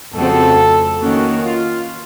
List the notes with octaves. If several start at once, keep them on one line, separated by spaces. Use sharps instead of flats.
F2 C#3 A3 C4 F#4 A4
D#3 A#3 C#4 F#4
F4